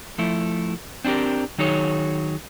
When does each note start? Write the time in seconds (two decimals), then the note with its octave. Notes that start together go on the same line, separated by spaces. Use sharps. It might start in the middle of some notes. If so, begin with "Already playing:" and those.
0.18 F3 A3 E4
1.05 C4 D4 F4 G4 A#4
1.58 D#3 F#3 D#4 G#4 C#5